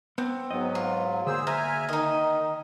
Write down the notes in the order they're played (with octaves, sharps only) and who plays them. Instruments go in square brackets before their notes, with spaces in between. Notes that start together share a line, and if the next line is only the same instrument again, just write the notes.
[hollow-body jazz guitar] B3 [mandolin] C4
[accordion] G#2 F#3 [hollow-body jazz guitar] B3 D#5
[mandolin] F4
[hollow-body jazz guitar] D3 A#3 [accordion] G#4 C5 E6
[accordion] E5 G#5 F6 [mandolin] A#5
[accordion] D#3 [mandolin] D#4 D#5